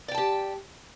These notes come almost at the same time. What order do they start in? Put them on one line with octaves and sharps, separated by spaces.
D5 G5 A5 G4